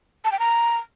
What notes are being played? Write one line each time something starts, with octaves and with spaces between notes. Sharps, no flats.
A5
G5
A#5